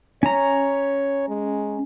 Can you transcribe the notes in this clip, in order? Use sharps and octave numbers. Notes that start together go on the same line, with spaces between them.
C#4 C#5 A#5
G#3